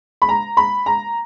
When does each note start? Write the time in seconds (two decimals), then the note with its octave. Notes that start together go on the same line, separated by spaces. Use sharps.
0.22 B5
0.29 A#5
0.57 B5
0.86 A#5